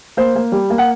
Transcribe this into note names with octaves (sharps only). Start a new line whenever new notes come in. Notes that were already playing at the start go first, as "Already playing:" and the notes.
A#3 C5
A#3
G3
A#3
F#5